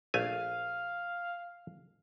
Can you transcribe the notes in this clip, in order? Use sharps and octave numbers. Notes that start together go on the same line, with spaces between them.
A#1 A3 F5 G#5